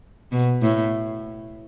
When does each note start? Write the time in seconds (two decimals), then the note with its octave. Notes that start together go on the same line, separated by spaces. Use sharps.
0.32 B2
0.62 A2